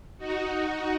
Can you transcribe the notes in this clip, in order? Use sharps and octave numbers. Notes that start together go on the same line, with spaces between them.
D#4 F#4